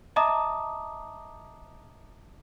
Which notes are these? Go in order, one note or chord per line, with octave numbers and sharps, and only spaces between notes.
D#5 E5 A5 A#5 D6 D#6